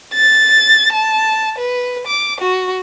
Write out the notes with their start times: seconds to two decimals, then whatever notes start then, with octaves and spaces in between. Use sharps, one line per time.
0.14 A6
0.93 A5
1.58 B4
2.07 D6
2.41 F#4